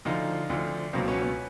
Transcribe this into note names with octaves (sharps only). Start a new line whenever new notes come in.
D2 D3 F3 D#4 F4
D2 D3 F3
C#2 B2 F#3 A#3 C4
B3 C#4
B3 C#4